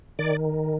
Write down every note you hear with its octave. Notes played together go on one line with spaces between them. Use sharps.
D#3 D5